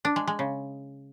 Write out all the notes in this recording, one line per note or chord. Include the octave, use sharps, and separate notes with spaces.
D4
G#3
G#3
C#3